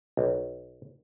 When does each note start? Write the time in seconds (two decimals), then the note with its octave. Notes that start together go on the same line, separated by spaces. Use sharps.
0.17 B1